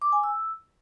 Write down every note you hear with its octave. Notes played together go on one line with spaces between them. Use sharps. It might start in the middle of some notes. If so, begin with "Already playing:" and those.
D6
G#5
E6